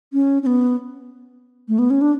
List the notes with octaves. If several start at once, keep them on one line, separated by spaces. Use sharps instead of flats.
C#4
C#4
B3
A3
B3
C#4
D4